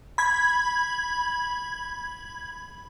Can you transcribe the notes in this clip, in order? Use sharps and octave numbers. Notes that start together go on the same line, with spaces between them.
B5 G#6